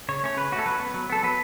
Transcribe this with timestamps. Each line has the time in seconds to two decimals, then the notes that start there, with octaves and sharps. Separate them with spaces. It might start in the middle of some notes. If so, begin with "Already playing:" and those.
0.09 C#3 C#5
0.23 A3 C#4 C#5
0.37 C#3 B4
0.52 C#4 F#4
0.55 A3 A4
0.66 F#3 B4
0.80 B3
0.94 F#3
1.10 B3 A4
1.23 F#3 B4